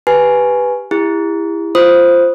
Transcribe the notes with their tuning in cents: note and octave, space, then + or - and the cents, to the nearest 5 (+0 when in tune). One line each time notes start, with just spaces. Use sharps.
G4 +0 B4 +0 G#5 +15
E4 +10 G4 +45
F4 -15 C5 +0 D#6 +0